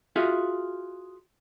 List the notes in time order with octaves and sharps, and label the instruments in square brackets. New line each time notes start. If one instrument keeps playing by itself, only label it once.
[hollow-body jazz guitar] F4 F#4 G#4 E5 F5